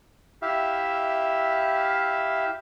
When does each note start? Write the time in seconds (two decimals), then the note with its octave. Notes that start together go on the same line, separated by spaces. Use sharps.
0.42 E4 G4 E5 F5